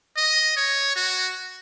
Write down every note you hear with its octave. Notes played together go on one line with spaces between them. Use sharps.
D#5
C#5
F#4